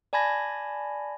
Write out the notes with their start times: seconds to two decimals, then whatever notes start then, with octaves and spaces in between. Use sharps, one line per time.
0.13 D5 G#5 A5 B5 G#6 A#6